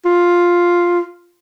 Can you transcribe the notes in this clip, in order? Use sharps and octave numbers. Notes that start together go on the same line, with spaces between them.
F4